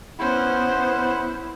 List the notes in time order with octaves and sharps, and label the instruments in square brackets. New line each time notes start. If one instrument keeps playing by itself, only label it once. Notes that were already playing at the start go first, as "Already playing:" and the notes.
[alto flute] B3 [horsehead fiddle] C#4 C5 [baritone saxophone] E4 [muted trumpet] F#5